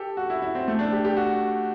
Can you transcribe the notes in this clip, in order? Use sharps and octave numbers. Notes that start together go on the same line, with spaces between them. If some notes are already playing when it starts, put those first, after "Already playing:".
Already playing: G4 A4
F#4
E4
E4
C4
A3
D4
G4
G4
F#4